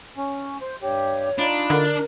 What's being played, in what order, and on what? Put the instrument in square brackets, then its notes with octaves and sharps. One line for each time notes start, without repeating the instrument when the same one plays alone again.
[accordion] C#4
C5
[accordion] G2 G4 [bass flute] C#5
[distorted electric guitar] D4 [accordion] D#4 F4 B5
[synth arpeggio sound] D3 [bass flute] A#4